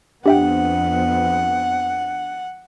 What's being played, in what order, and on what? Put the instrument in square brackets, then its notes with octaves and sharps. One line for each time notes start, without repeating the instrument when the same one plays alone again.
[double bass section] F2 B3 C4 [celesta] D4 [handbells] G4 E5 G5 [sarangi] F#5